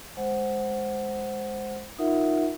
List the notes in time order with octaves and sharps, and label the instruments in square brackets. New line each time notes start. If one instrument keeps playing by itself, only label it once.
[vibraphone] G#3 C5 F#5
D#4 F4 A#4 E5 F#5